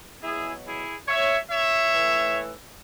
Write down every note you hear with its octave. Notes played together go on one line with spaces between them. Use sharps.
B2 F#3 E4 G#4
E4 G#4
C#5 E5
C#5 E5
A2 E3